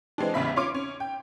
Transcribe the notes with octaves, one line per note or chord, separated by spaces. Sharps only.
E3 G#3 C4 D4
A1 E2 C#3 E5 B5 B6
C#4 F4 C#5 C6 D6 D7
C#4
G5